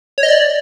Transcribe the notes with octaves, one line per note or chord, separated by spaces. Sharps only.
C#5
D#5
D5